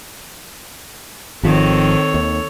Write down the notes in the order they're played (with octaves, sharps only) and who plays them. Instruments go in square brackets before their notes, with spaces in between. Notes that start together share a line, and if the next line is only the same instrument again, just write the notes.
[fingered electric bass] G#1 F3 [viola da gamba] D#3 C4 [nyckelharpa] A4 C#5
[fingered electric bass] D#2